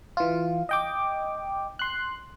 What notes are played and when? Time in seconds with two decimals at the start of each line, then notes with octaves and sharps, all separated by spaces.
0.17 E3 F4
0.69 D#5 G5 D6
1.79 C6 F#6